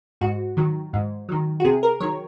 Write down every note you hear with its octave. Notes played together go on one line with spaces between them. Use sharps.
G#2 F#4
D#3 F#3
G#2
D#3 F#3
F#4
C3 G#4
A#4
D#3 F#3 C#5